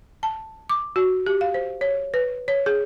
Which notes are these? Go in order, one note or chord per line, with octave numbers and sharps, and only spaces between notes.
A5
D6
F#4
G4
F5
C5
C#5
B4
C#5
G#4